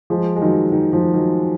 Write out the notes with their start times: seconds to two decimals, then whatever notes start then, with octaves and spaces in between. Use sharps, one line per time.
0.10 F3 G#3
0.36 G#3
0.42 D#3 F#3
0.72 D#3
0.93 F3
1.14 D#3 F#3